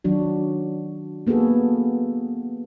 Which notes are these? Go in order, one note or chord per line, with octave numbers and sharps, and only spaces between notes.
D#3 F#3 D4 F#4
A#3 B3 F#4 G#4 A4